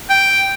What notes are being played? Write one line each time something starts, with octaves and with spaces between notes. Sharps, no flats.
G5